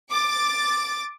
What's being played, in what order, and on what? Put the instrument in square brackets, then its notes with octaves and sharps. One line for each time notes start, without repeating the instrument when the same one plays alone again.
[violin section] D6 A6